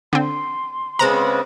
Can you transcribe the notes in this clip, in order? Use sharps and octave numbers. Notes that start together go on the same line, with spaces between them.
D3 C4 C6
C#3 G#3 B3 C4 D4 A#5